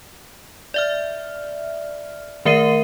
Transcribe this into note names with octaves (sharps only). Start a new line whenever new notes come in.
D5 E5 F6
D#3 A3 A#4 E5 C7 D#7